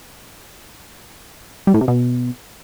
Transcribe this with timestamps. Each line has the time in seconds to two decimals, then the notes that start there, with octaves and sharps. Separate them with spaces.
1.67 G3
1.74 A2
1.81 C3
1.88 B2